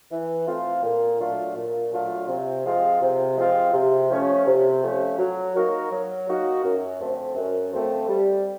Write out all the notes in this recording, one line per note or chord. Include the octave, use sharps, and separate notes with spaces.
E3
A3 C4 F4
A#2
F#3 A3 D4 F4
A#2
F#3 A3 D4 F4
C3
F3 G#3 C4 F4
C3
F3 G#3 C4 F4
C3
F3 A3 C#4
C3
F3 A3 C#4
F#3
A#3 D#4 F#4 A#4
F#3
A#3 D#4 F#4 A#4
F#2
D3 F3 A3 C4
F#2
D3 F3 A3 C4
G3